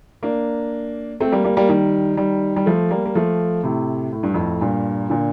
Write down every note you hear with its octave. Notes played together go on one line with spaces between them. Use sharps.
A#3 D4
A3 C4
G3 A#3
G3 A#3
G3 A#3
D#3 G3
D#3 G3
G3
F3 A3
G3 A#3
A#3
F3 A3
A2 C3
A2
G2
F2 A2
G2 A#2
A#2 D3